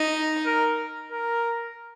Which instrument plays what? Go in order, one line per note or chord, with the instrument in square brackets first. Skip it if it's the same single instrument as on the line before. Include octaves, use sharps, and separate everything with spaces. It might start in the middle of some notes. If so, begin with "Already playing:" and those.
Already playing: [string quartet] D#4
[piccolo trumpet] A#4
A#4